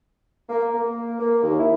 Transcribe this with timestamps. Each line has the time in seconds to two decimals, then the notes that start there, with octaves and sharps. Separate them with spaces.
0.49 A#3
0.74 A#3
1.19 A#3
1.42 D#2
1.59 E4